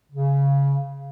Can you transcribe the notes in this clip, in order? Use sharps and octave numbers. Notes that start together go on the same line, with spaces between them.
C#3